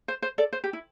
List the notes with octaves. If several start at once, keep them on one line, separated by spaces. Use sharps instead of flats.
C5
C5
A4 D5
C5
G4
E4